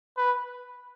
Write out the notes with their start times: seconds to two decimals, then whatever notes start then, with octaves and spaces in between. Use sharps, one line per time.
0.17 B4